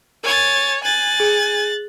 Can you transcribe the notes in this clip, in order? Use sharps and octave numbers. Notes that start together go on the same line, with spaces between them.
A#4 C#5 G#5 A6
G#5 F#6 A6
G#4